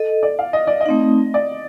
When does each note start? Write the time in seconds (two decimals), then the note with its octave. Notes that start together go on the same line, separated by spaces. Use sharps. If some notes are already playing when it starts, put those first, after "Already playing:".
Already playing: A4 D#5
0.23 D5
0.39 F5
0.53 D#5
0.67 D5
0.81 D#5
0.86 A3 C4 D#4
1.34 D5